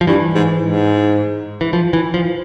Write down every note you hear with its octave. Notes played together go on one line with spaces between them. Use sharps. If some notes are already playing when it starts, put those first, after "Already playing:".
F3
G2 E3
G#2
G#2
E3
F3
E3
F3